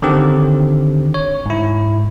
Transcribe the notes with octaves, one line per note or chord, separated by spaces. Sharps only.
D3 D#3 C4 G4
C#5
G#2 E4